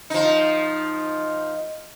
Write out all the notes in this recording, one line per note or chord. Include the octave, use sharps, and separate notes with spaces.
F3 D#4